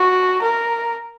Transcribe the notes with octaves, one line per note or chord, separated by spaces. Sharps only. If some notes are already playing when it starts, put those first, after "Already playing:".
Already playing: F#4
A#4